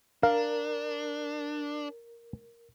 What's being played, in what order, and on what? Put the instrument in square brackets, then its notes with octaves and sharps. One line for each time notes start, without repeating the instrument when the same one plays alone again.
[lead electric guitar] D4 [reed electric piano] A#4 [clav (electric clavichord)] F5